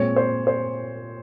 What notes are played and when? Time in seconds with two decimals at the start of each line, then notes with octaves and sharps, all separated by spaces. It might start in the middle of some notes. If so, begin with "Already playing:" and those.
Already playing: A#2 G#3 C4 C#5
0.16 C5
0.47 C5